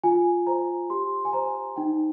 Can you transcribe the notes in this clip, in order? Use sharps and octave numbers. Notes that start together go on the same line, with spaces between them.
F4 G#5
C5 A#5
G4 C6
G#5
C5 A#5
D#4 G5